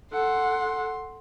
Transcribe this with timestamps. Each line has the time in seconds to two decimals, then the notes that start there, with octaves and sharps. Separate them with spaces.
0.13 A4 F#5 C6